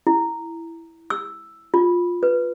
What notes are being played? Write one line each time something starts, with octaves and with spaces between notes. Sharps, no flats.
E4
E6
F4
B4